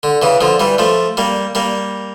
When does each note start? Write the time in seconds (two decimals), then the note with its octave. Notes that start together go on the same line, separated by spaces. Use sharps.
0.03 D3
0.22 C#3 E3
0.41 D3 F3
0.60 E3 G3
0.78 F3 A3
1.17 G3 A#3
1.55 G3 A#3